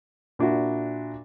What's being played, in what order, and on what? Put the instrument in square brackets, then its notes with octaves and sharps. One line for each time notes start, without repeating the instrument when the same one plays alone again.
[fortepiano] A#2 D4 E4 F#4